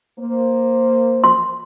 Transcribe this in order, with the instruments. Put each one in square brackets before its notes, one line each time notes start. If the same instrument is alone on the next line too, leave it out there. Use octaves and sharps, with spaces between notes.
[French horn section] A#3 C5
[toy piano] C6